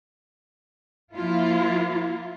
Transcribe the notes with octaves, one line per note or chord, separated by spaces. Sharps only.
F3 A#3 E4 F4